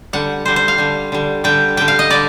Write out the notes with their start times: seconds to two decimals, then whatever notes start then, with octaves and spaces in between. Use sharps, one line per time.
0.13 D3 G3 F#5
0.45 D3 G3 C5
0.56 C5
0.68 F5
0.78 D3 G3
1.12 D3 G3
1.44 D3 G3 G5
1.77 D3 G3 G5
1.88 F5
1.99 D#5
2.10 D3 G3 D5